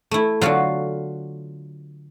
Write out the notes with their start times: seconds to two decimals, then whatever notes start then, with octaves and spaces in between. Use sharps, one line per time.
0.11 A3 E4
0.41 D3 F#3 F4 F#4 F5